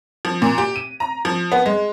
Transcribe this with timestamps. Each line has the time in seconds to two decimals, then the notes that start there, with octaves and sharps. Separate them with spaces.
0.25 F3
0.42 A#2
0.58 G4
0.76 D#7
1.00 A#5
1.25 F3
1.52 B3
1.66 G#3